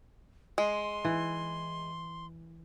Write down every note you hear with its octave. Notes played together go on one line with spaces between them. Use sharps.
G#3 C6
E3